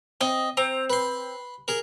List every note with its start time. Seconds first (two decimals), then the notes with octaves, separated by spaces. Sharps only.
0.21 C4 D#5
0.57 C4 A#5
0.90 B4 C6
1.68 G#4 A#4